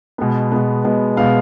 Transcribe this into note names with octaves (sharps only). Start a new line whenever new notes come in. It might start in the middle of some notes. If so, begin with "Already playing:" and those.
B2 G#3 B3
B2 G#3 B3
B2 G#3 B3
B2 G#3 B3 F5